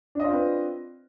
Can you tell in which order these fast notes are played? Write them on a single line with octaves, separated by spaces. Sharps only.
D4 D#5 F4 C4 B4